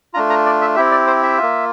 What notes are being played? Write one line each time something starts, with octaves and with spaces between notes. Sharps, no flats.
A3 D4 F4 A#5
A#5
D5
E5
C4 E4 G4 E5
D5
C5
E5
A#3 F4